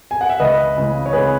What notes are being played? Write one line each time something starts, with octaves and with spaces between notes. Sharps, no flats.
G#5
F#5
E5
C#2 B4 D#5
C#3 E3 G#3
C#5
C#2 G#4 B4